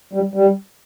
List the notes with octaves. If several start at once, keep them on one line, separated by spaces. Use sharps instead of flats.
G3
G3